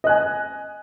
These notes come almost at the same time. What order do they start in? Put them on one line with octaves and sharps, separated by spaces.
D#5 F#6 G#5